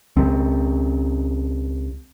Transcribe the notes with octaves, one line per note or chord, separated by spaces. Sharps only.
C#2 C4